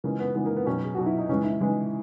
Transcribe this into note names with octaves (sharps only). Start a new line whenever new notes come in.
C#3 E3 G#3 A#3
B3
C#3 E3 G#3 B3
A#3
B3
B2 F#3 C#4
G#4
B2 F#3 F#4
E4
D#4
C#3 E3 G#3 C#4
E4
C#3 E3 G#3